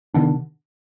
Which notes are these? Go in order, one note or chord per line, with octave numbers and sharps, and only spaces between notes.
C3 D#3 B3 D4